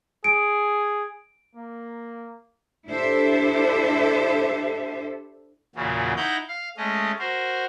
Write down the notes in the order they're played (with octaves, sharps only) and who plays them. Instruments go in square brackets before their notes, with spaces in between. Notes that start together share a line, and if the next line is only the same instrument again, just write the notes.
[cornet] G#4 [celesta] D7
[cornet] A#3
[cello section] D4 E4 G4 A4 C5 E5
[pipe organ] E2 A#2 C#3 E3 F#3
D#4 E4 F#5 A#5 G6
F5
G#3 A3 C#4 D#5
F#4 A#4 C5